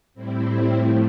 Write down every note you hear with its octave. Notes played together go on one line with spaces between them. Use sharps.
A2 G3 C4 E4
A2 F3 A3